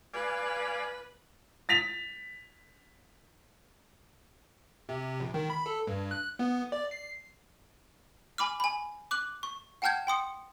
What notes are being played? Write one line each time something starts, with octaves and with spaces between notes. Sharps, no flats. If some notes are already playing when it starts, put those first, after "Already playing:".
B4 D5 F5 G#5
A6 B6 F7
C3
A#1
D#3
B5
A4
G2
F#6
B3
D5
C7
G#5 B5 D6 F6
G#5 B5
D6 F#6 F#7
C#6
F#5 G5 A5 F6 G6 G#6
G5 C6 D#6 C#7